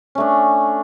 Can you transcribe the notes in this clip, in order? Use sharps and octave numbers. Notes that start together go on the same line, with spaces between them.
A3 C#4 D4